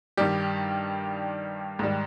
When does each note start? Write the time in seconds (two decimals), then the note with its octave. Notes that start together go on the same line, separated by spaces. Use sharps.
0.17 G2 D#3 G3 G4
1.79 G#2 D#3 G3